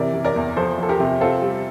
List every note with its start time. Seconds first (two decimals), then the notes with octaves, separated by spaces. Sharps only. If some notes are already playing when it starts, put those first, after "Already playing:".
Already playing: C3 E3 A#4 D5
0.14 C3
0.24 A#4 D5
0.36 E2
0.56 F3 A4 C5
0.78 F3 A4
0.89 G4 A#4
1.00 C3
1.21 C4 F4 A4
1.42 G3